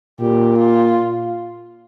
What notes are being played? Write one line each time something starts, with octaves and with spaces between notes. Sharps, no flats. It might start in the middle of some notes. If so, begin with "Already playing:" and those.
A#2 G4
F4